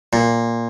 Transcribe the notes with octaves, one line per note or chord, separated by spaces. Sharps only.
A#2